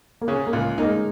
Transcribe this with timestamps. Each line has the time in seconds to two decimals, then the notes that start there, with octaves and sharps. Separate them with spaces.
0.21 A#3
0.28 C#3 C#4
0.47 A#3
0.53 C#2
0.78 A#3 D#4
0.85 G#3